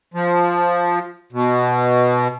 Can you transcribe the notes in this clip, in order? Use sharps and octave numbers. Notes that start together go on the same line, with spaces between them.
F3
B2